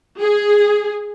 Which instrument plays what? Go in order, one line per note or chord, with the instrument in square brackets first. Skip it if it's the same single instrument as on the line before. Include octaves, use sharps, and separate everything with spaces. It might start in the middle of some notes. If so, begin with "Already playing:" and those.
[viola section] G#4